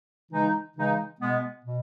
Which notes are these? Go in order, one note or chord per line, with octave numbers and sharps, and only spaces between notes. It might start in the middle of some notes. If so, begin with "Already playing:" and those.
C#3 E3 G#3 D#4
C#3 E3 G#3 D#4
B2 G#3 B3
B2